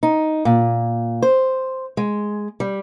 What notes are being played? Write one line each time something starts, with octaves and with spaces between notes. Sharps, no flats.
D#4
A#2
C5
G#3
G3